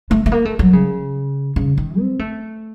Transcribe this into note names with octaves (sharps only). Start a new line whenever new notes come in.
A3
A3
A#3
A3
F#3
C#3
C#3
D#3
C4
A3